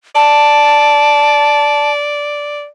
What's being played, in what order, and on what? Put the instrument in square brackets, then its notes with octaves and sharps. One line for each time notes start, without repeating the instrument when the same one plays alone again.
[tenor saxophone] D5 [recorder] A5